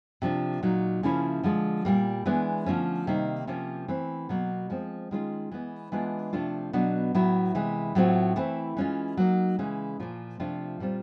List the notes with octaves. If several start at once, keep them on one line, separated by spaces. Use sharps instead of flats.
C3 F3 A#3 D4 F4
A#2 F#3 A#3 D#4
C#3 F3 A#3 C#4 E4
D3 F3 G#3
A#2 G3 A#3
E3 G#3 B3 D4
D3 F3 A3 C#4
C3 D#3 G3 A#3 D#4
C3 F3 A#3 C#4
E3 A3 C4
B2 F#3 A#3
F3 G#3 C4
D#3 G#3 C#4 F4
E3 G#3 B3
E3 G#3 B3 D4 F4
C3 F3 A3 D4 F4
B2 F#3 B3 D4
A2 F#3 B3 E4
C3 E3 G#3
A2 F#3 A3 C4 F4
E3 A3 C4 E4
E3 G#3 C#4 F4
F#3 A#3 D#4
C#3 E3 G#3 C#4
A#2 F3 A#3
C3 F3 A3 D4 F4
A#2 G3 C4 F4